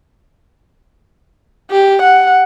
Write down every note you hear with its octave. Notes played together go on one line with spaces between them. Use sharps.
G4
F#5